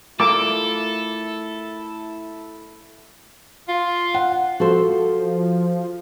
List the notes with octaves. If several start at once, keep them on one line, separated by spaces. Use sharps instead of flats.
A3 E4 F4 A4 A#4 D6
F4
F#5
F3 F#4 A4 C5